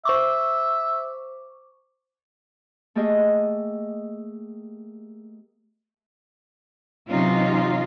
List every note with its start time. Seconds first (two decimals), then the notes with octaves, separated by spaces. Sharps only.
0.05 C5 E5 C#6 D6
2.95 A3 A#3 G4 G#4 D#5
7.09 C3 E3 F#3 C#4 D#4 F4